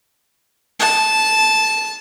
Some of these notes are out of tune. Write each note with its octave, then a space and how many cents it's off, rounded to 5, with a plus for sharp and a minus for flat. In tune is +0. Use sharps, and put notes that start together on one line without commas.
A5 -10